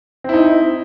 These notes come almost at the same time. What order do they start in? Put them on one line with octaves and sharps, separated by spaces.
C4 E4 D#4